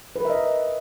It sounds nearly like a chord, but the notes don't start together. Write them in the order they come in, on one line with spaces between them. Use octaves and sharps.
B4 A#4 E5 D#5